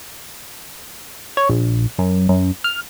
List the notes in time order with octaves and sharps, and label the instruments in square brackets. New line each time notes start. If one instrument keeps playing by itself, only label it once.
[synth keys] C#5
A#1
F#2
F#2
F6